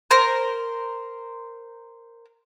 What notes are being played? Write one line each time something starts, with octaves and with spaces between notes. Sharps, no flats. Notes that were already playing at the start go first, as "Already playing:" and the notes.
A#4 C5